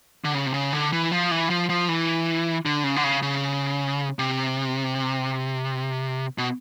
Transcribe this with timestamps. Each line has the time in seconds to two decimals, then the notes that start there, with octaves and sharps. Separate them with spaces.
0.24 D3
0.34 C#3
0.46 C3
0.54 C#3
0.73 D3
0.93 E3
1.12 F3
1.31 E3
1.50 F3
1.69 F3
1.89 E3
2.65 D3
2.84 C#3
2.96 D3
3.04 C#3
3.22 C#3
4.19 C3
6.38 B2